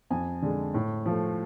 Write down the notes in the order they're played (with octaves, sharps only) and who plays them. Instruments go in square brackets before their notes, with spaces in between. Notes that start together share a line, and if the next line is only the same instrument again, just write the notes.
[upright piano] F2 G#5
D3 G#3
A2
F3
A3